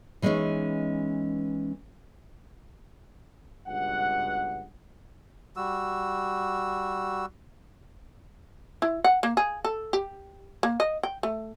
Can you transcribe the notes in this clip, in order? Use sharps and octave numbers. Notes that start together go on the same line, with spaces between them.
E3 G#3 A3 B3 C#4 D#4
C#2 G2 B2 F#5
G3 F#4 E6
E4
F#5
A#3
G#4
A4
G4
A#3
D#5
G5
A3